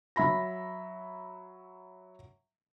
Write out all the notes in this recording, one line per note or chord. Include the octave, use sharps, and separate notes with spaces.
F#3 E5 B5 A#6